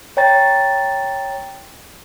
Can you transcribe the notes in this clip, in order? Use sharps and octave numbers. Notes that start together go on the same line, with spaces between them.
C#5 G5 A#5 A6